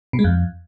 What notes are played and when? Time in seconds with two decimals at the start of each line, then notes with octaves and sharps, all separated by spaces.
0.13 B2
0.19 G#3
0.24 F2